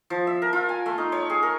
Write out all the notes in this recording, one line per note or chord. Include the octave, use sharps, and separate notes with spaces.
F3
E5
A#4
F4
G#5
A3
D#4
C#5
G#4
A#4